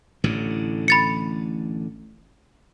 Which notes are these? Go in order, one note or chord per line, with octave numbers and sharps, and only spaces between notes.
A1 A2 D3
B5 A6 C#7